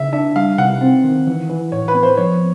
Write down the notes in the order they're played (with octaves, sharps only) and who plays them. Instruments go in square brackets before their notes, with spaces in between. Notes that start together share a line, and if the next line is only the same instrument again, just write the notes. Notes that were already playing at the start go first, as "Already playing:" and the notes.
Already playing: [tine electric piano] C#3 [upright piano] E5
[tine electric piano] D4 [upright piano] E5
[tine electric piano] G3 [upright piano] F5
[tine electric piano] C3 [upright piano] F#5
[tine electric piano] C4
D#3
E3
E3
[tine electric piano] A2 [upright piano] C#5
[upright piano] B4
[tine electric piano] B3
[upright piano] C5
[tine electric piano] F3 [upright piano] C#5